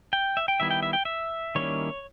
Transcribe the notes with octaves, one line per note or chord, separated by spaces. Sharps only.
G5
E5
G5
D#3 G3 B3 E4 E5
G5
E5
G5
E5
D#3 G3 A#3 C#4 E4 C#5